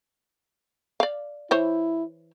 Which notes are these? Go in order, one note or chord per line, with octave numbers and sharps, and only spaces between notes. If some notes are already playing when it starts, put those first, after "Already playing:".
D5 F5
E3 E4 C5 C#5